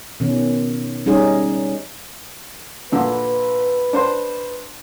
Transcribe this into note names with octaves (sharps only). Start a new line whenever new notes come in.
B2 D#3 C#4
G3 C#4 D#4 G#4
A#2 D3 B4
D4 C5 C6